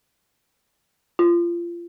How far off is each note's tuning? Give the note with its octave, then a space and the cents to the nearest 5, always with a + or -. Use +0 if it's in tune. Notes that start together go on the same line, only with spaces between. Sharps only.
F4 -25